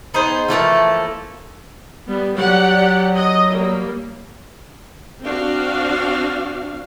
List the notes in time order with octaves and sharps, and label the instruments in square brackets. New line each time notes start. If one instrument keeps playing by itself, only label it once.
[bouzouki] B3 D#4 G#4 C5
E3 F3 A3 A#3
[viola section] G3 B3
[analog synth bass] F#3 [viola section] G4 D5 F#5
[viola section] D#5
G3 A#3
C4 D4 F#4 F5